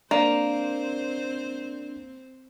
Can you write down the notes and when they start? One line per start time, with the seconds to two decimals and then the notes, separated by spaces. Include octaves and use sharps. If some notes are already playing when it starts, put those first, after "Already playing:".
0.11 A#3 C4 D4 A#4 C5 D5